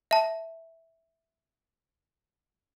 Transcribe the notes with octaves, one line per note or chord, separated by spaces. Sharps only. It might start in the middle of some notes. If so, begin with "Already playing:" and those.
E5 A5